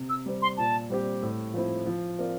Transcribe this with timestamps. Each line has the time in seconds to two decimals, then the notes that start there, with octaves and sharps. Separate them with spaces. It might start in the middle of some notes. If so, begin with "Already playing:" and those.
Already playing: C3
0.09 E6
0.26 G3 C4
0.42 C6
0.57 A#2 A5
0.90 G3 C4 G4
1.22 A2
1.54 F3 C4 E4
1.86 F3
2.19 C4 F4 A#4 D5